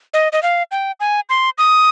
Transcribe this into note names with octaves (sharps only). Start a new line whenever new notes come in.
D#5
D#5
F5
G5
G#5
C6
D#6